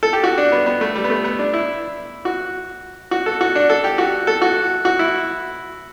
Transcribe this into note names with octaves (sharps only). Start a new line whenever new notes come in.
A4
G4
F#4
D4
B3
B3
A3
G3
B3
A3
B3
D4
E4
F#4
F#4
A4
F#4
D4
A4
G4
F#4
A4
F#4
F#4
E4